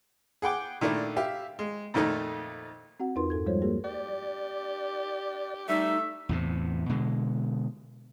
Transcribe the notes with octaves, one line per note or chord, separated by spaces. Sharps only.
G#4 F#5 G5 D6
A#2 D#3 A3 D4 E4
G4 E5 F5
G#3
F2 A#2 D#3 A3 D#4
C4 F#4 F#5
E2 D#4 F4 A#4 B4 C6
G2 A4 G#6
F3 G3 G#3 F4 C5 C#5
A#3 F#4 G#4 A#4
G4 D5
G3 A3 D#4 E5
E2 A2 C3
B2 D3 G#3